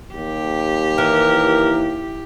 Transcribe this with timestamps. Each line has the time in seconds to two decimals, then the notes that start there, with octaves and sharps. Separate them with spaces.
0.14 D#2 G4
0.98 E3 A#4